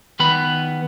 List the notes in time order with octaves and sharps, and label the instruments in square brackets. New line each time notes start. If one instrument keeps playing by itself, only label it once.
[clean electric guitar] D#3 B3 B4 B5